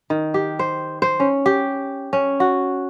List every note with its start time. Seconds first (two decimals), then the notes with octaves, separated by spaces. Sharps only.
0.10 D#3
0.34 G4
0.59 C5
1.02 C5
1.20 C#4
1.46 G4
2.13 C#4
2.40 F#4